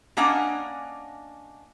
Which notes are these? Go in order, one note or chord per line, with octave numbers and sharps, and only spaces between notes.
A#3 C#4 D4 D#5 F#5 G#5